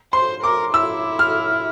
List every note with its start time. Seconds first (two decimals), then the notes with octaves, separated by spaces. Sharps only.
0.13 C5 C6
0.43 A#4 D6
0.73 E4 E6
1.19 F6